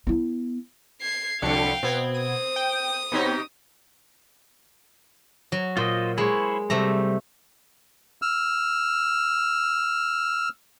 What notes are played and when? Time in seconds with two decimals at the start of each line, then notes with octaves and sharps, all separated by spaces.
0.07 B3 E4
1.01 G#6 C7
1.42 C2 F2 D3 D4 F5 G5 C#7
1.83 B2 B3 C4 G#6
2.20 D#6
2.56 G5
3.12 B2 B3 C4 D#4 G4 C#5
5.52 F#3
5.77 A#2 F4 C5 D#5
6.18 G#3 E4 C5 C#5
6.70 C3 G3 A3 A#5
8.22 E6 F6